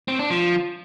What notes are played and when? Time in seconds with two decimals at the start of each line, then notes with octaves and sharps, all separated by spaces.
0.08 C4
0.19 D4
0.30 F3